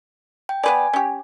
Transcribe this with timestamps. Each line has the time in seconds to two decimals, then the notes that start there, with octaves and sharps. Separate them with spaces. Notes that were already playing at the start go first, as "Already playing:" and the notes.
0.49 G5
0.64 B3 B4 D5 G#5
0.93 C#4 G4